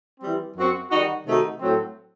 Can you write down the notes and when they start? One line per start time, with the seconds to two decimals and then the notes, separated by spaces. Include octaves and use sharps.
0.20 E3 G3 C4
0.56 F#2 F#3 C4 F#4
0.90 D#3 G3 D#4 F#4
1.25 C3 D#3 A3 D#4 F#4
1.60 A2 F#3 A3 C4